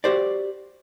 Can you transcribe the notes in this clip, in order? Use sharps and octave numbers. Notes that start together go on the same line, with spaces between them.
F#4 G4 C5 D5